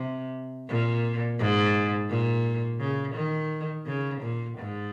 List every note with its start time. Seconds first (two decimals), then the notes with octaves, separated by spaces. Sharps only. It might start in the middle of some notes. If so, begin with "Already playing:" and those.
Already playing: C3
0.68 A#2
1.39 G#2
2.09 A#2
2.80 C#3
3.15 D#3
3.86 C#3
4.21 A#2
4.58 G#2